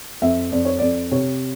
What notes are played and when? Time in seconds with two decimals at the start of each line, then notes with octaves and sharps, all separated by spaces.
0.22 F2 E5
0.52 F2 D5
0.65 C#5
0.78 F2 D5
1.11 C3 C#5